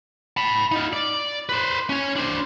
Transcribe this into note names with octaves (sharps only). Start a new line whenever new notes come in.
A5 B5
D#4 F4
D5
B4 C5
C#4 G#5
D4 C5